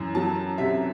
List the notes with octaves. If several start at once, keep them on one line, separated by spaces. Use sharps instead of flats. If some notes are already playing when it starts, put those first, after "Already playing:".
Already playing: F#2 E3
F#3 A5
C3 E5